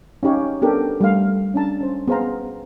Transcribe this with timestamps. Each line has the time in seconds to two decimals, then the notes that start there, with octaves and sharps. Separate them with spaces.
0.23 C#4 D#4 G4 C#5 F5
0.62 B3 D4 G4 A4 A#4
1.00 G3 A3 F5
1.54 C#4 D4 A5 A#5
1.80 C#4 C5
2.08 B3 G#4 C5 F5 A#5